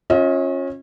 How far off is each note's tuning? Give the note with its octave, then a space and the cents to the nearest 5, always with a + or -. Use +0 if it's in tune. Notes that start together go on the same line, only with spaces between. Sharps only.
C#4 -25 F4 +20 D#5 +35